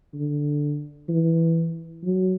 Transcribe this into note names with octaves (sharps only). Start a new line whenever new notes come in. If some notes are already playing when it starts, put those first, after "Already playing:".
D3
E3
F#3